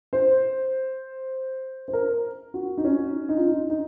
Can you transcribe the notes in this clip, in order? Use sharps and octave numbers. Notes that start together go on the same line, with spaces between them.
C5
C5
A#4
F#4
D#4
C#4
D#4
F4
D#4
D#4